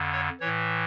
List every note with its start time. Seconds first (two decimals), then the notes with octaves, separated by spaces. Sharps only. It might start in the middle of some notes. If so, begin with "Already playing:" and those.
Already playing: F2 D3
0.12 C#5
0.40 A2 E3 C#5